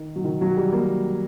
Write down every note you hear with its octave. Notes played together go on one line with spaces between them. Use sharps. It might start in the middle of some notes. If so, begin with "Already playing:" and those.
Already playing: D#3
F#3
D#3
F#3
G3
A#3